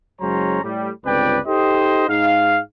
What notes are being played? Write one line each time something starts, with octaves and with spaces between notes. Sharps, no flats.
F#1 F#3 G#3 C#4 C5 A#5
A2 G3
G1 C#2 C4 B4 D5 G5
D#4 G4 A4 C5 D#5
G#2 D#4 G#4 F5